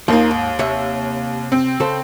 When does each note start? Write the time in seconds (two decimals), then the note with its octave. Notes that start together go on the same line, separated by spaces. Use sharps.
0.08 D#2 F3 A#3 D#4
0.31 G#2
0.59 C3 C#5 E5
1.52 C4
1.80 C#3 A4 C5